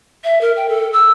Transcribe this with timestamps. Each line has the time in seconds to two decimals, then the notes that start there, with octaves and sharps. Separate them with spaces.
0.24 E5
0.41 A#4
0.57 G5
0.69 A4
0.93 E6